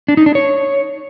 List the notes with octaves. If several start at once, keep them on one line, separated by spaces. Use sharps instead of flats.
D4
D#4
D4
C#5